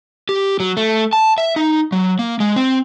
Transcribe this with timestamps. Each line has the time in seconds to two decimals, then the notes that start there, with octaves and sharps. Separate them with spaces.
0.29 G4
0.60 F#3
0.77 A3
1.13 A5
1.38 E5
1.56 D#4
1.92 F#3
2.19 A#3
2.40 G#3
2.56 C4